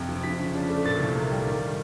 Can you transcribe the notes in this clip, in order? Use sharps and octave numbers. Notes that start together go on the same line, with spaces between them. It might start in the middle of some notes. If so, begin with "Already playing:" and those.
Already playing: F2 C3
F3
F3 B6
C#3
D4
A3
A#2 A6
C2
A#3
G3
D#3